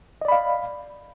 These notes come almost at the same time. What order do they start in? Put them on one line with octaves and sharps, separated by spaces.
D#5 D5 B5 F5